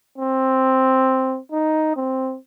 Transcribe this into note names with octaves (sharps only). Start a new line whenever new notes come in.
C4
D#4
C4